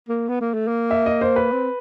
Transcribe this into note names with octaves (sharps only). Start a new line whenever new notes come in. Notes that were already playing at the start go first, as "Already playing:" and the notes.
A#3
B3
A#3
A3
A#3
E5
D#5
C5
B4
C4